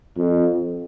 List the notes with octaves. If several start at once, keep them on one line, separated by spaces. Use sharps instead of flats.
F2